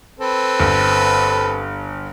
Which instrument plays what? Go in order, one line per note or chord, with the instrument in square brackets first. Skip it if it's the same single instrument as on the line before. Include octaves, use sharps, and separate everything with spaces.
[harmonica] C4 A4 B4
[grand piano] G1